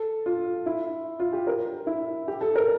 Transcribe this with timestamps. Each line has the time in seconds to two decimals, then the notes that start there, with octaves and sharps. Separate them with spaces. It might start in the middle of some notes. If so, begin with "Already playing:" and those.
Already playing: A4
0.26 F4
0.66 E4
1.19 F4
1.33 G4
1.47 A#4
1.87 E4
2.28 G4
2.41 A4
2.55 A#4